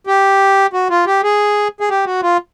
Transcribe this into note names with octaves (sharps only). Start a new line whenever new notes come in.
G4
F#4
F4
G4
G#4
G#4
G4
F#4
F4